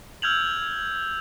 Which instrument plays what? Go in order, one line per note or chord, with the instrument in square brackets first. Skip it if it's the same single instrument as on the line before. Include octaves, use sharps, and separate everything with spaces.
[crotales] E6 F6 G6 G#6 F7 F#7